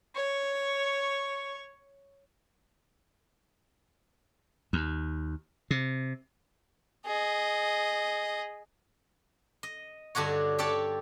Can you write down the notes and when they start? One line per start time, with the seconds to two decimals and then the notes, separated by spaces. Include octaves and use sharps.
0.15 C#5 C#6
4.73 D#2
5.71 C3
7.06 G#4 D#5
9.63 D#5
10.15 G2 D3 D4 F#4 C#5
10.58 G4 A4 C#5 D5 A5